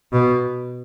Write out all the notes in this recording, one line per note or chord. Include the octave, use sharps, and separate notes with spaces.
B2